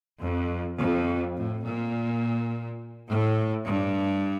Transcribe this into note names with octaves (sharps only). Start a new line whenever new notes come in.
F2
F2
A2
A#2
A2
G2